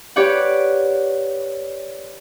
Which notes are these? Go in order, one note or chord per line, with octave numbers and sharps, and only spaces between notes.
G4 B4 C#5 D5 F#5